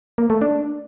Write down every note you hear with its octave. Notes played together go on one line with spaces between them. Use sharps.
A#3
A3
D4